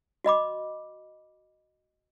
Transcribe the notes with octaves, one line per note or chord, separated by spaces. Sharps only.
F#4 D#5 B5 D6